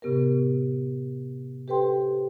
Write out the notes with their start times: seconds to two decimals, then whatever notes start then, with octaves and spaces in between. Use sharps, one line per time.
0.02 A2 C3 B3 G4 A#4
1.68 G4 A4 B4 C5 G5 C6